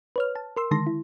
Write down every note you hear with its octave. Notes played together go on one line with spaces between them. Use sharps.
B4 C#5 F6
A5
A#4 C6 E6
D3 D#3 G#3 A5 C6 A#6
E4